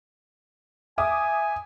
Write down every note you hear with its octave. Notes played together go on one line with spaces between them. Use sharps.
E5 G#5 D6 D#6